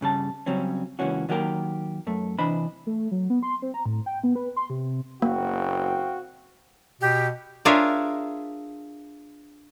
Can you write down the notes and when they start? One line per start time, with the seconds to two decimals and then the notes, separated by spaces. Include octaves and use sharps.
0.01 G2 C#3 G3 A5
0.46 C#3 F#3 G3 C4 C#4
0.99 C#2 E3 A#3 C#4 F#4
1.29 D#3 F#3 A#3 G4 A#4
2.07 F#2 A3
2.39 C3 E3 D4 C5 D#5 B5
2.87 A3
3.11 F#3
3.30 B3
3.43 C6
3.62 C4
3.74 A#5
3.86 A2
4.06 G5
4.24 B3
4.36 B4
4.56 C6
4.70 C3
5.22 F#1 A#3 C4 F#4 F5 G5
7.01 B2 G4
7.65 D4 F4 G#4 A#4 C#5 E5